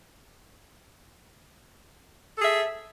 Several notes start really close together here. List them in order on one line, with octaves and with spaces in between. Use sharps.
A4 G#4 E5